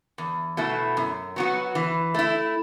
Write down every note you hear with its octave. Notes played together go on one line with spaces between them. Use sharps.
E2
B2 A3 E4
F#2
F#3 B3 F#4
E3
A3 E4